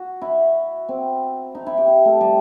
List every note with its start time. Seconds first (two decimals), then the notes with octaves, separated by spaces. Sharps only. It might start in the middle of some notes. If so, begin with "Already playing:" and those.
Already playing: F#4
0.21 E4
0.89 C4
1.55 D#4
1.66 E4
1.78 G4
1.87 E4
2.05 A3
2.21 G3